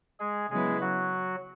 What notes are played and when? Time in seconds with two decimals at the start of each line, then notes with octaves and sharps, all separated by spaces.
0.20 G#3 G#4
0.50 C#3 F#3 G#3 B3 E4 G#4 B4
0.81 F#3 F#4